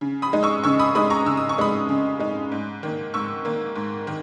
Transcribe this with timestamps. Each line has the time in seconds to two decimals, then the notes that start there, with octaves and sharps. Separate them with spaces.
0.01 C#3
0.22 B5 D#6
0.33 G#3 D#4
0.43 C#6 E6
0.64 C#3 C#6 E6
0.79 B5 D#6
0.95 G#3 D#4 B5 D#6
1.10 A#5 C#6
1.26 C#3 E6
1.37 D#6
1.49 C#6
1.58 G#3 D#4 B5 D#6
1.89 C#3
2.19 G#3 D#4
2.52 G#2
2.83 D#3 A#3
3.14 G#2 C#6 E6
3.45 D#3 A#3
3.76 G#2
4.07 D#3